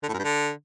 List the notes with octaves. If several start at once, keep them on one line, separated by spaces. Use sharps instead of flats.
D3
A2
F#2
G2
D3